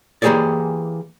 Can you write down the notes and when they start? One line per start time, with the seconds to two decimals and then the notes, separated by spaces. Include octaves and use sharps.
0.22 E3 A#3 G4 G#4 C#5 D5